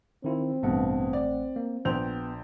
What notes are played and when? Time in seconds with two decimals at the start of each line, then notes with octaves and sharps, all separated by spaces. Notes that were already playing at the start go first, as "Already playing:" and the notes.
0.24 D#3 C4 E4 F4
0.63 A1 G2 B2 A3 F#5
1.13 D5
1.56 A#3
1.85 A#1 B3 C5 G5 G6 F7